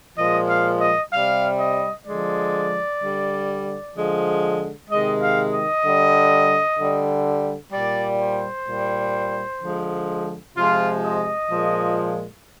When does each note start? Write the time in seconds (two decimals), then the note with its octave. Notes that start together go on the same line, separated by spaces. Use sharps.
0.18 A#2 F3 G#3 D#5
0.49 F5
0.81 D#5
1.13 C3 G3 F5
1.60 D#5
2.06 D3 F3 G#3 D5
3.01 D3 G3
3.96 D3 F3 G#3
4.90 C3 D#3 G#3 D#5
5.22 F5
5.52 D#5
5.85 D3 G3
6.79 D3 G3
7.73 A#2 G3 D5
8.21 C5
8.68 A#2 G3
9.62 D3 F3 G#3
10.57 C3 F3 G#3 F4
11.04 D#5
11.51 A#2 F3 G#3